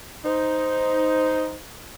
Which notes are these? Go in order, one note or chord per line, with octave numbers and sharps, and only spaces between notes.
D#4 C5